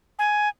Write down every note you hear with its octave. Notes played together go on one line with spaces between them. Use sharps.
G#5